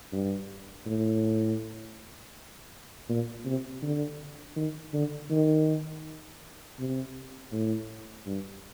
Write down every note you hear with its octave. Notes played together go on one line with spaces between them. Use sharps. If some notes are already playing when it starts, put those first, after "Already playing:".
G2
A2
A#2
C3
D3
D#3
D3
D#3
C3
A2
G2